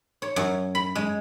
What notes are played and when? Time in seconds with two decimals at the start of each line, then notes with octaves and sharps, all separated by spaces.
0.22 C#5
0.36 F#2
0.75 B5
0.95 G#3